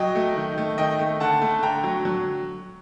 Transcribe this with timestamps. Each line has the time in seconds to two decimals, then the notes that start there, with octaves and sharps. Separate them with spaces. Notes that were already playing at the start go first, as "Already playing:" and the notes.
Already playing: F#3 D#5 G5
0.15 A3
0.36 D#3
0.58 A3
0.78 D#3 D#5 G5
0.99 A3
1.20 D3 F#5 A5
1.41 A3
1.63 D3 G5 A#5
1.84 F#3
2.05 F#3